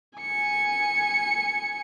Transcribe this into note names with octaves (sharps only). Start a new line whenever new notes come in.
G#5 C#7